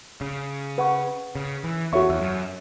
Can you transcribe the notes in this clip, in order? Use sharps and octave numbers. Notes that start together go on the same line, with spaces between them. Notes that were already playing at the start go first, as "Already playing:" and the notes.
C#3
B4 F#5 C#6
C#3
E3
E2 F#4 A4 C#5 E5 C#6
E2
F#2